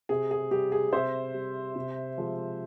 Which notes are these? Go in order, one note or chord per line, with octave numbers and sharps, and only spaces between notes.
C3 G#4
G#4
G3 G4
G#4
C3 C5 E5
G3
C3
F3 G#3